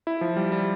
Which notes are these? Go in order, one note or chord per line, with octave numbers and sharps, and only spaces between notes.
E4
F3
G3
G3